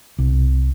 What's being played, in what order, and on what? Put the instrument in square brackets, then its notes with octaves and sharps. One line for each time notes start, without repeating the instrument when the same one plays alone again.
[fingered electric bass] C2